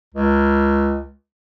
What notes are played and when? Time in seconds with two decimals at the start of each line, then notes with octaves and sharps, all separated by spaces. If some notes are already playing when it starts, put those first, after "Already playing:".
0.15 C#2